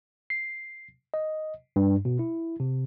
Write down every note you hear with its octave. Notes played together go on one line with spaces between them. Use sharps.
C7
D#5
G2
B2
E4
C3